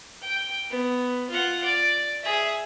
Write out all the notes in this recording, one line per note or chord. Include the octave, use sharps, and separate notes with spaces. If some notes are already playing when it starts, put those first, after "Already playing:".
G5
B3
F4 F#5
D5
G#4 E5